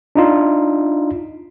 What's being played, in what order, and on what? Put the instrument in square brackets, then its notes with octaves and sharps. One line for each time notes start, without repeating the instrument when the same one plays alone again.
[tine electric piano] D4 D#4 F4